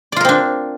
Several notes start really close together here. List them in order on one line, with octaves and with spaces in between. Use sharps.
D5 F4 A#4 C4 D4